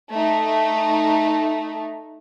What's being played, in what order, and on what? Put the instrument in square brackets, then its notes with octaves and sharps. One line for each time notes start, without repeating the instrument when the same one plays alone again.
[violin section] A3 D#4